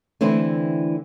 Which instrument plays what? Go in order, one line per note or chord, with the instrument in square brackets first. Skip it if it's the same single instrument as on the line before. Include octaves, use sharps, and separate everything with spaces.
[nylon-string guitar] D3 E3 A3 C4 E4